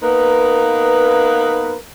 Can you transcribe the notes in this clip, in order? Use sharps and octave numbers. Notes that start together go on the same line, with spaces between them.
A#3 B3 D#4 A#4 B4